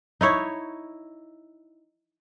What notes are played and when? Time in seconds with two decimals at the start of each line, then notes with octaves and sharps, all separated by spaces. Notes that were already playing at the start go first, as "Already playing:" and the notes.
0.21 D#4 E4 C#5